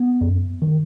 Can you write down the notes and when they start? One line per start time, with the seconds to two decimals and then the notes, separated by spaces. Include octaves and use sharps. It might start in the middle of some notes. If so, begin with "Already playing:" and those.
Already playing: B3
0.21 F#2
0.62 D#3